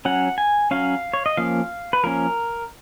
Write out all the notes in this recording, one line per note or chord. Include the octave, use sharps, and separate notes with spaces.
F#3 C#4 F#5
G#5
F#3 C#4 F5
C#5
D#5
F3 A#3 C#4 F5
B4
F3 A#3 C#4 A#4